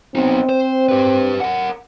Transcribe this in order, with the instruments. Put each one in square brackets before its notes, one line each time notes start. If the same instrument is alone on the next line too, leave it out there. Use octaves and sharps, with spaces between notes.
[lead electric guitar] B3 D#4 [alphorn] C4
[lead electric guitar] C5
G4 B4
A#4 F#5